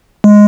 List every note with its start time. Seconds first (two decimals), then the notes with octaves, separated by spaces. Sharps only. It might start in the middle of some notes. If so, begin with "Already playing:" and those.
0.24 G#3